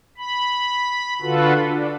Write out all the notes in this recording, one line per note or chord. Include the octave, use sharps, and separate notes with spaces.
B5
D3 F4 F#4 A4 B4
D4